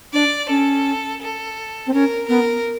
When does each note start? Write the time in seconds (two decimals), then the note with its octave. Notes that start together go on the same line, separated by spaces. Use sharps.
0.13 D4 D5
0.49 C#4 A4
1.22 A4
1.87 C4
1.93 C#4 A#4
2.29 B3 A#4